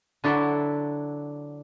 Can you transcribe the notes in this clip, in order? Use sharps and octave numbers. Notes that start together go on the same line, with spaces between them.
D3 F#3 D4 E4 F#4 A4